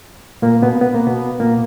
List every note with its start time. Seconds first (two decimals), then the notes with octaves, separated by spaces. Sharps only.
0.42 A#2 A#3
0.62 B2 B3
0.81 B3
0.95 A#3
1.07 B2 B3
1.40 A#2 A#3